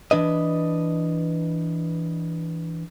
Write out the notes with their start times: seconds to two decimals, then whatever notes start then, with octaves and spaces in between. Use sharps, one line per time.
0.11 E3 D4 B4 D#5